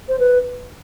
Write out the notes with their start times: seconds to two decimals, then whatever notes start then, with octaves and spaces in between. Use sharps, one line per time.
0.09 C5
0.19 B4